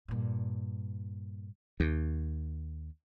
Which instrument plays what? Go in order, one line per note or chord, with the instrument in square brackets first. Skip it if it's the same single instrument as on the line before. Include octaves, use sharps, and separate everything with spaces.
[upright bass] G2 A#2
[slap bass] D#2